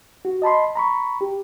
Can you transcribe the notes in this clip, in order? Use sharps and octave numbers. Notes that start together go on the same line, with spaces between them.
F#4
D#5 A5 B5 C6
A#5 B5 C#6
G4